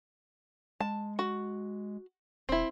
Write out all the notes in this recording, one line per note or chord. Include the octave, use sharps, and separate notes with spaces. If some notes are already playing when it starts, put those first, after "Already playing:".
G#3 A5
F#4
E1 C4 E4